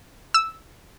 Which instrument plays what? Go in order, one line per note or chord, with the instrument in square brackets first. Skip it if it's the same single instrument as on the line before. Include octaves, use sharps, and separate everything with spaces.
[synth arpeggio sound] E6